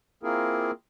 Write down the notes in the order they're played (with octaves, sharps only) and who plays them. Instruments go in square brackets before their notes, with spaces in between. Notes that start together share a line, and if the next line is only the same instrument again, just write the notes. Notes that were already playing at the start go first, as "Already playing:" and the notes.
[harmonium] A#3 C4 E4 F4 G#4 A#4